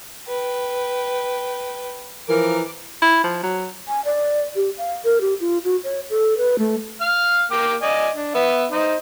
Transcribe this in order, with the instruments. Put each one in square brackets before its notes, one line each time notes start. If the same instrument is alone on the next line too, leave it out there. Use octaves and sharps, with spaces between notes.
[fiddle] B4 G5
[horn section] E3 F3 A#4 [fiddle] D6
[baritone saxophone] E4
F3
F#3
[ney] G#5
D5
G4
F5
A#4
G4
F4
F#4
C#5
A4
B4
A3
[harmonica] F5 F6
A#3 G5 D6
D5 D#5 G#5
D4
B3 E5 F#5
D#4 C5 D#5